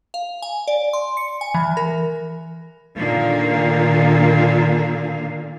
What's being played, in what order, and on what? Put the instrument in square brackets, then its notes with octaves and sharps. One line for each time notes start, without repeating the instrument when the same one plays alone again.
[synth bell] F5
G#5
D5
C6
C#7
G#5
E3
A#4
[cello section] A#2 D3 D#3 A#3 F5